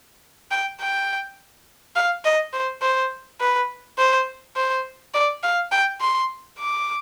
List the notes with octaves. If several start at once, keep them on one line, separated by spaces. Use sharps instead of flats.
G5
G5
F5
D#5
C5
C5
B4
C5
C5
D5
F5
G5
C6
D6